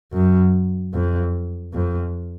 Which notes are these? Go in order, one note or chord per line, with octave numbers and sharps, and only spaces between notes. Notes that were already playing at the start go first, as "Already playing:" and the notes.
F#2
F2
F2